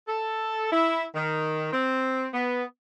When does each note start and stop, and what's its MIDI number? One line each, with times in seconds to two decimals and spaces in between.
0.08 0.69 69
0.72 1.04 64
1.15 1.70 51
1.73 2.28 60
2.34 2.63 59